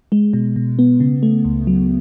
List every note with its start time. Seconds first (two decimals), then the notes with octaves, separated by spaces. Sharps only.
0.12 G#3
0.33 B2
0.56 B2
0.79 B3
1.00 C#3
1.23 A3
1.45 C#2
1.67 F#3